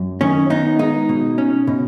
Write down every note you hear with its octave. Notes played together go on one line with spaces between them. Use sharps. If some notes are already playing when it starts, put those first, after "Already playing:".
Already playing: F#2
D#3 C#4
B3 D#4
G#3 D#4
B2
C#4
B2